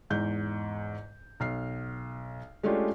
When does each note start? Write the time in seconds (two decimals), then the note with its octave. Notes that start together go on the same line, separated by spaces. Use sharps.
0.10 E2 G#2 G6
1.40 B1 F6 C7
2.63 G#3 A3 C#4 D4 F4 G4